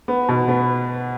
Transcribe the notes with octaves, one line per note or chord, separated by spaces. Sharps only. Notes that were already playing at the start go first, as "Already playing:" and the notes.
B3
B2
B3